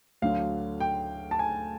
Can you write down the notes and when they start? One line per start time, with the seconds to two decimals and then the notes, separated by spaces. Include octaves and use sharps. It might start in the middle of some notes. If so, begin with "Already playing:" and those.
0.22 D2 D3 F#3 F5
0.80 G5
1.31 A5
1.39 G#5